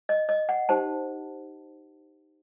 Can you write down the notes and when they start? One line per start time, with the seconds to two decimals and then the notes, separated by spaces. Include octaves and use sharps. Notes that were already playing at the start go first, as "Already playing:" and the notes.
0.09 D#5
0.29 D#5
0.49 F#5
0.69 D#4 G4 C5 A5